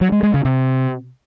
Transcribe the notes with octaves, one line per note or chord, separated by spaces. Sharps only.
F#3
G#3
G#3
C#3
C3